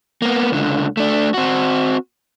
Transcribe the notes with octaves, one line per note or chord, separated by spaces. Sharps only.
A#3 B3
C#2 D3
A3 D4
C4 F#4